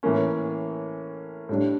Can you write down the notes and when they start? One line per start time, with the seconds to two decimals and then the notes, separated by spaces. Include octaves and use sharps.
0.03 A2 E3 A#3 C#4
1.49 A2 G3 D4